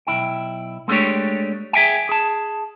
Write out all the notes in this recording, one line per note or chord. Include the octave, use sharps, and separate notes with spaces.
B1 G2 E4 G5
G#3 A3 B3 D4 G4 C#5
G#4 E5 F5 G5 G#5
G#4 A5